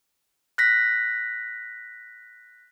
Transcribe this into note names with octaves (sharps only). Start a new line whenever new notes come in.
F#6 A#6 B6